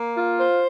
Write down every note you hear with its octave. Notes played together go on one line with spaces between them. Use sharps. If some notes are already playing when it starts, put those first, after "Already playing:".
Already playing: A#3
F4
C5